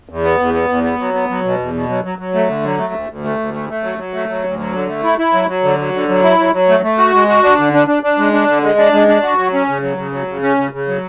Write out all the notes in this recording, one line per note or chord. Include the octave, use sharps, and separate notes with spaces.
E2
B3
E2
B3
E2
B3
F#3
B3
F#3
B2
E2
B2
F#3
F#3
F#3
A3
D3
F#3
A3
D2
D2
A3
D2
A3
A3
F#3
F#3
A3
F#3
D2
F#3
D3
A3
E4
E4
F#3
F#3
D3
F#3
D3
F#3
E4
F#3
F#3
A3
A3
F#4
G#3
F#4
D4
D3
D4
D4
D4
G#3
D4
D3
G#3
D4
G#3
D4
F#4
F#3
C#4
C#3
F#3
C#3
F#3
C#3
C#4
C#3
C#3
F#3